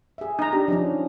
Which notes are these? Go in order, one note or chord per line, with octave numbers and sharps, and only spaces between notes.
G#4 E5
D#4 A#5
D4 G4
F3 C#4 D#4